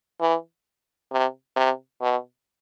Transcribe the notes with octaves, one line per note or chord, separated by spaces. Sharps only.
E3
C3
C3
B2